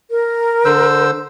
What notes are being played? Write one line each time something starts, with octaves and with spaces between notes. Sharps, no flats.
A#4
D3 C5 E6